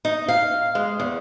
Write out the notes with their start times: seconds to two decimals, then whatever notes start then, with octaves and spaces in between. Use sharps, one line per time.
0.05 D#4
0.28 F5
0.75 G#3
1.00 E2